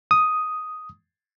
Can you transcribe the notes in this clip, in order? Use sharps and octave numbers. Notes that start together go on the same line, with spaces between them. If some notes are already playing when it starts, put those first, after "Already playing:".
D#6